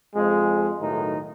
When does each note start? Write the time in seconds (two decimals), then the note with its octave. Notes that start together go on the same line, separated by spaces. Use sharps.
0.15 F2 F3 G#3
0.80 B1 A2 D#3 D#4